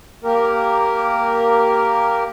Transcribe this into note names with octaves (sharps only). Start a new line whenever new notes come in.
A#3 G4 A#4